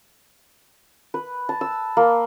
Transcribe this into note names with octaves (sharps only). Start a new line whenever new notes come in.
B4
A5
E6
A#3